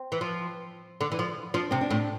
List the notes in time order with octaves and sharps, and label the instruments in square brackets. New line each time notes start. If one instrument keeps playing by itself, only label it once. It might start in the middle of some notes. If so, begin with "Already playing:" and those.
Already playing: [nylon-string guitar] C4
[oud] E3
F3
D3
E3
F3
[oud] F3 [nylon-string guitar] D4
[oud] C3 [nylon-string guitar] C4
[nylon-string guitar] D4
[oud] A2